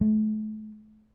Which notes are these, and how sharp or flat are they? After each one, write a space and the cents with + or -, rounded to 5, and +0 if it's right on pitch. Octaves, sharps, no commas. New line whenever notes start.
A3 -35